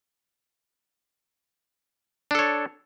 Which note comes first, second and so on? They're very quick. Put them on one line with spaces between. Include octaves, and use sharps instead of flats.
D4 A4 C#5